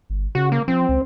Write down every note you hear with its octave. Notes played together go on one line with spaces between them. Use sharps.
G1
C#3 F#4
A#3
F3 C4
C#2